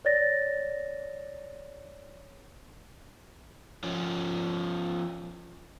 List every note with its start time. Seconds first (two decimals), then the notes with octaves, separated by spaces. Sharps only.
0.05 C#5 D5 A6 A#6
3.84 F3 C#4